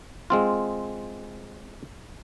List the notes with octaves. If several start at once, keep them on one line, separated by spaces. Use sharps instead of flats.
G#3 C4 F4